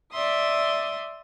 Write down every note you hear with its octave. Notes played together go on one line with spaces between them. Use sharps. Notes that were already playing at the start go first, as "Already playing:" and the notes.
D5 E5 C6 D#6